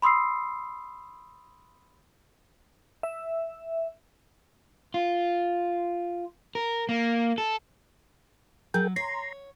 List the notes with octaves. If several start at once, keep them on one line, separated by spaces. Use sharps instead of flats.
B5 C6 D#6 E6 C7
E5
F4
A#4
A#3
A4
F#3 G#4 A#4 G5
C#5 A#5 C6